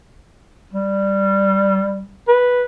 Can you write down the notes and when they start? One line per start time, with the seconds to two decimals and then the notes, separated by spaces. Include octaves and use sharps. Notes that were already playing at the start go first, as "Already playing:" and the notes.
0.73 G3
2.28 B4